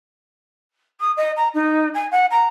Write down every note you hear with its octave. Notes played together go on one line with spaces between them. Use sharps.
D#6
D#5
A#5
D#4
G#5
F#5
A#5